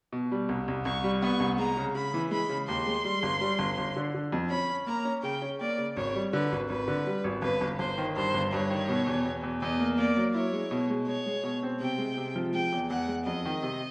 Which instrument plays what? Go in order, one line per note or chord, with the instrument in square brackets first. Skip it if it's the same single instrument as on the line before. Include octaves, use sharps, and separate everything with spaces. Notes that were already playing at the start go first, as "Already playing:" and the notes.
[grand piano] B2
G3
C2
C2
[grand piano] C2 [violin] C#6
[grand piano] G3
[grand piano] B3 [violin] C#6
[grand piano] C2
[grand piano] G#3 [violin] A#5
[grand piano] C#3
[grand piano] C#3 [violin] B5
[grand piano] E3
[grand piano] G#3 [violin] B5
[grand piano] C#3
[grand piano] D#2 [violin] C6
[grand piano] G#3
G3
G1
G3
G1
G1
D3
D3
F2
[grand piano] C#4 [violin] B5
[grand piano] C#4
[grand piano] A#3 [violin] A#5
[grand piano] C#4
[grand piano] C#3 [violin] G5
[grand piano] C#4
[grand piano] A#3 [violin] D5
[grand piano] C#3
[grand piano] G#1 [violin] C#5
[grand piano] G3
[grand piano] D3 [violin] B4
[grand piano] G#1
[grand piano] G#1 [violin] B4
[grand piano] D3
G3
G#1
[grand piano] G1 [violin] B4
[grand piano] G1
[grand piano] G1 [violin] C5
[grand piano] D#3
[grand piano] G2 [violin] C5
[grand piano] G1
[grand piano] G2 [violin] C#5
[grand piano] D#3
B2
E2
B2
E2
[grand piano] E2 [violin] D#5
[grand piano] A#3
[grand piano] A#3 [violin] D5
[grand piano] F#3
[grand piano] E4 [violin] C#5
[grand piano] G#3
B2
G#3
[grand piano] G#3 [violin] C#5
[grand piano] G#3
B2
C4
[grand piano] C3 [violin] G5
[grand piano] G#3
C3
F3
[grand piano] G#3 [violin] G5
[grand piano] E2
[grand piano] E2 [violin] F#5
[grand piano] G#3
[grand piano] F2 [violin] D#5
[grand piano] D#3
C3